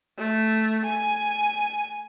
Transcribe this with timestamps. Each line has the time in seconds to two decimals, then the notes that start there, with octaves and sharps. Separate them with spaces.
0.18 A3
0.85 G#5